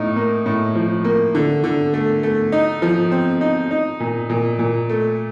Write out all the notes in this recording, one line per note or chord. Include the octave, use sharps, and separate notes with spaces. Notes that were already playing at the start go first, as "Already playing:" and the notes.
Already playing: A2 D#4
A#3
A2
F3
A#3
D3
D3
A3
A3
D#4
F3
C4
D#4
D#4
A#2
A#2
A#2
A3